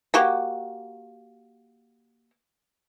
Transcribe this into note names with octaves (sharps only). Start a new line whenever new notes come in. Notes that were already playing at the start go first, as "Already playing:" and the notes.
A#3 F#4 G4